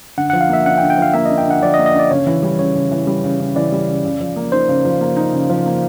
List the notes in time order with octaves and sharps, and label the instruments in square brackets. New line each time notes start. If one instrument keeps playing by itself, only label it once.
[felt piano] D3 [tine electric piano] F#5
[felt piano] F3 [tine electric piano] F#5
[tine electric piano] F5
[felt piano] A#3 [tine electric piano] E5
[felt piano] D4 [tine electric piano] F#5
[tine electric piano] G5
[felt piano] D3
[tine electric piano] G5
[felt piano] F3
[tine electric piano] F5
[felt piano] A#3 [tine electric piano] E5
[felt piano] D4 [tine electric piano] D#5
[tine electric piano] G5
[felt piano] D3 [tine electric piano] F#5
[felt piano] F3 [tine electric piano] D5
[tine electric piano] D#5
[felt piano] A#3
[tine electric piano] D#5
[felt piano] D4 [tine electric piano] D5
[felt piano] C#3 [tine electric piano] C#5
[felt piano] E3
G3
[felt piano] C#3 [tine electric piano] C#5
[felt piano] C#3
E3
G3
C#3
C#3
[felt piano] E3 [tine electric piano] D5
[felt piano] G3
C#3
C#3
F3
A#3
[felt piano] D#4 [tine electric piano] C5
[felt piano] C#3
F3
A#3
D#4
C#3
F3
A#3